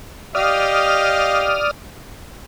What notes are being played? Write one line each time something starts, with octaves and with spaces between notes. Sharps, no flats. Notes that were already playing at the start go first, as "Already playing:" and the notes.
G4 D5 D#5 F5 D#6 F6